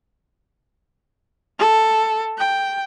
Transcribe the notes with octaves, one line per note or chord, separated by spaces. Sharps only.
A4
G5